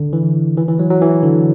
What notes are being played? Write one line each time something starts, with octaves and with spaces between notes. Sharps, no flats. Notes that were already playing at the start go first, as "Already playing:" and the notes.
Already playing: D3
E3
E3
E3
F#3
F#3
E3
D3